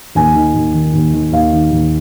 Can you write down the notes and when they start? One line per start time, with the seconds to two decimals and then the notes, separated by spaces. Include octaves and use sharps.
0.15 D#2 G#5
0.35 D#3
0.54 D#2
0.74 D#3
0.94 D#2
1.14 D#3
1.32 D#2 F5
1.52 D#3
1.71 D#2